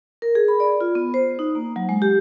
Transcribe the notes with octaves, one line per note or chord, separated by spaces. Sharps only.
A#4
G#4
B5
D5
F4
B3
C5
D#4
A#3
F#3
G#3
G4